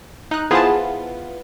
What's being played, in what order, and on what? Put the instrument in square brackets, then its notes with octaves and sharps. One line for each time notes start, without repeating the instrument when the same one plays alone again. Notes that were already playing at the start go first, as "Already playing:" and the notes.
[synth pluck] D#4 F#6
[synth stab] E3 B3 F4 [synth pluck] G#4 C5 A5